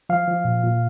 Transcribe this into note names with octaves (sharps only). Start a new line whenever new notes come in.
F3 F5
F3
A#2
A#2